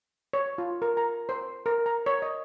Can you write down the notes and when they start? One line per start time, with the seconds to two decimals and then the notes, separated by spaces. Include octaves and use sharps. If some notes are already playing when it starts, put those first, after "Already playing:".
0.33 C#5
0.58 F4
0.82 A#4
0.97 A#5
1.29 C5
1.66 A#4
1.86 A#5
2.06 C#5
2.22 D#5